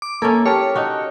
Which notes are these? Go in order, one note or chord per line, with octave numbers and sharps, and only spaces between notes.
D6
A#3 C#4 E4 A4
G4 A#4 C#5 A5
D#4 F#4